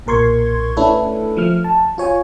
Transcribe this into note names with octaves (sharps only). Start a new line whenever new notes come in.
B1 A#2 A#4 C6 C#6 G#6
A3 C#4 D4 E4 A4 B4
F3 A3 F6
A5
F4 C#5 G#5